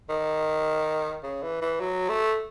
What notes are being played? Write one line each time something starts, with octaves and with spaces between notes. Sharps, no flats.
D#3
C#3
E3
E3
F#3
A3